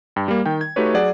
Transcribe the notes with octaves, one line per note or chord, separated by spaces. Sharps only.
G2 G5
G3 A#3
D#3 G5
G#6
A3 D#4 F#4 G4 B4 C#5
F#3 G#4 D5 F#5